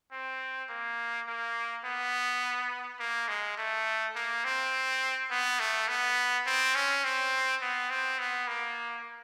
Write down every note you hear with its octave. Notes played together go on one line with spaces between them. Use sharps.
C4
A#3
A#3
B3
A#3
G#3
A3
A#3
C4
B3
A3
B3
C4
C#4
C4
B3
C4
B3
A#3